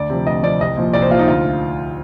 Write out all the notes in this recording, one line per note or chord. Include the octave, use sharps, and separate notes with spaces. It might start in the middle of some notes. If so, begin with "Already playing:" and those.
Already playing: D2 D5
C3 F3
D2 D#5
C3 F3 D5
C2 D#5
A#2 F3
C2 D5
C5
A#2 F3 F4
D#4
D2 F4